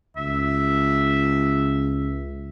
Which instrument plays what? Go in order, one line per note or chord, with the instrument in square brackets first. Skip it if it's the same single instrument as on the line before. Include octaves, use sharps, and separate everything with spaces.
[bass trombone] C#2 [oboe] E5